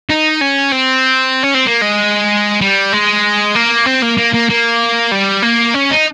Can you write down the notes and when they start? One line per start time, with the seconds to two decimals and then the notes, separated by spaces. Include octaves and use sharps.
0.10 D#4
0.41 C#4
0.72 C4
1.44 C#4
1.55 C4
1.67 A#3
1.82 G#3
2.61 G3
2.92 G#3
3.55 A#3
3.86 C4
4.02 A#3
4.17 A#3
4.33 A#3
4.49 A#3
5.12 G3
5.42 A#3
5.74 C#4
5.91 D#4